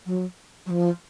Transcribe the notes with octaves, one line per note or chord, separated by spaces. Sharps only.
F#3
F#3
F3